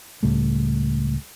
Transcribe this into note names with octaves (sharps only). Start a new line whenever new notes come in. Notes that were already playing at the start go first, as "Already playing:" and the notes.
C#2 A2 G3 A3